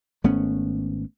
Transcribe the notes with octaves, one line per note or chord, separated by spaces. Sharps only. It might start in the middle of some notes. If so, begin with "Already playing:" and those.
G#1 A3 B3 C#4